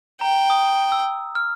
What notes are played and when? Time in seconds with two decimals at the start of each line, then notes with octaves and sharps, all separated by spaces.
0.21 G5 A#5
0.50 D#6
0.92 E6
1.35 F6